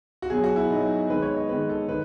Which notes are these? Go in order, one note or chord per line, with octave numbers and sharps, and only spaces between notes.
F#4
B2 F#3 B3 G#4
F#4
E4
B2 F#3 B3 D#4
D#4
D#3 G#3 B3 B4
C#5
D#5
D#3 G#3 B3 B4
A4
D#3 B4